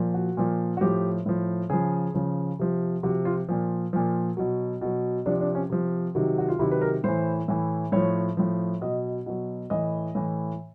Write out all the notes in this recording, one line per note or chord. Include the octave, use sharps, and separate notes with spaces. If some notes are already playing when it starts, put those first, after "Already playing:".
Already playing: A#2 F3
F#4
A#2 F3
F#4
A2 F3 G4
A2 F3
C#3 F3 G#4
C#3 F3
C3 F3
C3 F3 F#4
F4
A#2 F3
A#2 F3
B2 F#3
B2 F#3
C3 F3 D4
D4
C#4
C3 F3
C3 D#3 F#3
F#4
F4
C3 D#3 F#3 E4
B4
A#4
A2 E3 C5
A2 E3
A2 F3 C#5
A2 F3
B2 F#3 D#5
B2 F#3
A2 E3 D#5
A2 E3